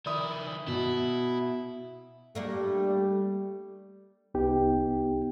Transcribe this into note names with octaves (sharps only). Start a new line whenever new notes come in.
D#3 E4 D5 D#6
B2 E4
G3 A3 A#3 D4
C2 B3 D#4 G4 G5